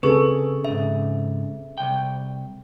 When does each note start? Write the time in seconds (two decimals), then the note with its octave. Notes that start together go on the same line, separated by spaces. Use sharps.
0.03 C#3 C4 G#4 A4 B4 C#6
0.65 G#2 C#3 E5
1.78 C2 G5